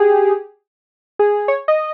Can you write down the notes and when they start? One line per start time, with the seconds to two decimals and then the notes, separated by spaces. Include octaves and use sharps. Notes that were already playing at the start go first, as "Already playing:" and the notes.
Already playing: G4 G#4
1.19 G#4
1.48 C#5
1.68 D#5